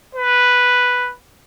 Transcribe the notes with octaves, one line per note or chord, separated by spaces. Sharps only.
B4